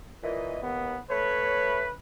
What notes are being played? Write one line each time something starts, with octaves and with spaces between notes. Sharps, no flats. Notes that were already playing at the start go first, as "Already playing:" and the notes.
A#2 E3 D#5
D#2 B3
A3 B4 C#5